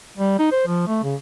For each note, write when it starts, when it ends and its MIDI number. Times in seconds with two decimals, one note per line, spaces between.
0.17 0.35 55
0.39 0.49 63
0.52 0.64 72
0.67 0.84 53
0.87 0.99 57
1.04 1.15 49